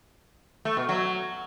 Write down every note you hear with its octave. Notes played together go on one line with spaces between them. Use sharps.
A3
B2
F#3